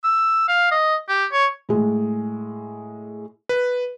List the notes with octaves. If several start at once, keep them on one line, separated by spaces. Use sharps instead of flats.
E6
F5
D#5
G4
C#5
A2 G#3
B4